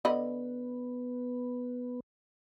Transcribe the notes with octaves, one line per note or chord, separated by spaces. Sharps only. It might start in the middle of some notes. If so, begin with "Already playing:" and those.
D3 B3 D#5 B5